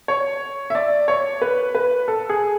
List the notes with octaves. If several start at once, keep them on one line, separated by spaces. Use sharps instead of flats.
C#5
E5
D5
C#5
B4
B4
A4
G#4